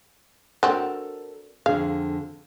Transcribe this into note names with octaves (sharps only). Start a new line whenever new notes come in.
F#3 C4 D4 A4 A#4
F2 D3 G#4 F5